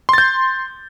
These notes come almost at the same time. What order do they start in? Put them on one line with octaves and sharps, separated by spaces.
C6 A6 G6